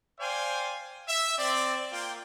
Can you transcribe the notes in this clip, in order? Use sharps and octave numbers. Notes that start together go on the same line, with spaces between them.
C5 D5 F5 G5 G#5
E5
C4 D5
A#3 F4 G5